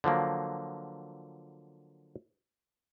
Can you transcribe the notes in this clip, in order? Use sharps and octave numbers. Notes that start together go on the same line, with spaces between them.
D3 F3 F#3 A#3